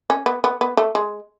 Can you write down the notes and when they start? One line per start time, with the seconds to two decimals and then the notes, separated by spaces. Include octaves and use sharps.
0.10 C#4
0.26 B3
0.44 B3
0.61 B3
0.77 A3
0.95 G#3